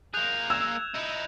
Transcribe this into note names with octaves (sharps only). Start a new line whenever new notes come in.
A#3 G#4 F#6 G6 F7
E6 G#6 E7
D#4 E4